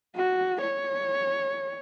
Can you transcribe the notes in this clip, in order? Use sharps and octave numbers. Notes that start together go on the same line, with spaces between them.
F#4
C#5